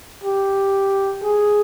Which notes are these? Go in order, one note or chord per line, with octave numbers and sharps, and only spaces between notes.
G4
G#4